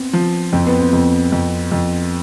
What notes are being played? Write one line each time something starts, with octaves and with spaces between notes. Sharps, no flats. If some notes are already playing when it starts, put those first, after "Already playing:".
Already playing: B3 C4
F3
F2 C4
B3
C4
F2
F2
F2